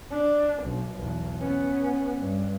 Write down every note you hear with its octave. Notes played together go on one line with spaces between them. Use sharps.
D4
B1
B1 E2
B3 C#4
G2